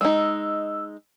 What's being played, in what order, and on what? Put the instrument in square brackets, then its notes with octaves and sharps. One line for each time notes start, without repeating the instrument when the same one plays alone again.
[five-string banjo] G#3 D#4 [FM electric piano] D#5 E6